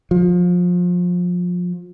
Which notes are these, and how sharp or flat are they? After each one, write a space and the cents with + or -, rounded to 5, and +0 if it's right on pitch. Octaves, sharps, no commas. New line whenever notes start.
F3 +25